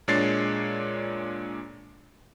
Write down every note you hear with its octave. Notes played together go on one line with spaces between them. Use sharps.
A#2 G#3 D4 C#5 A6 C7